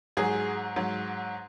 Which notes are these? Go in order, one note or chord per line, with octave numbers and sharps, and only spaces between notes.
G#2 F#3 G#4
G#2 F#3